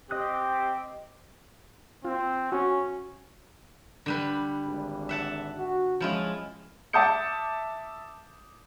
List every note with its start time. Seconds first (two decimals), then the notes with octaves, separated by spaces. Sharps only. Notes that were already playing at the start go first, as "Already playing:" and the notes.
0.11 C4 G4 D#5 D#6 F#6
2.05 C4 F4
2.52 C#4 F#4
4.06 D3 G3 B4
4.64 G#1 D4
5.09 E5 F#5 A5
5.58 F#4
6.00 F3 G#3 C#4 E4 F4
6.93 E5 A5 D6 D#6 G6 C#7